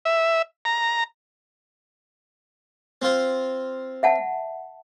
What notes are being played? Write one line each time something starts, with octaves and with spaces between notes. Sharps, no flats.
E5
A#5
C4 F4 C5
E5 F#5 A5